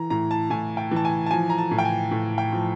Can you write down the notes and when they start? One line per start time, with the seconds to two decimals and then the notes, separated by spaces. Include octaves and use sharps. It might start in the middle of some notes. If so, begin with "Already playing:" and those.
Already playing: E3 A#5
0.10 A2 A#5
0.31 A5
0.50 A2 G#5
0.77 G5
0.91 E3
0.96 A5
1.05 G#5
1.26 A5
1.31 F3 G#5
1.50 A#5
1.58 A5
1.71 A2
1.78 G5
1.85 G#5
2.11 A2
2.38 G5
2.52 F3